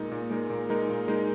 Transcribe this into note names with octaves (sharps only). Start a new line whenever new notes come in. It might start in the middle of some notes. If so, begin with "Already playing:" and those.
Already playing: A#2 G#3 D#4 A#4
A#2
G#3 D#4 A#4
A#2
G#3 D#4 A#4
A#2
G#3 D#4 A#4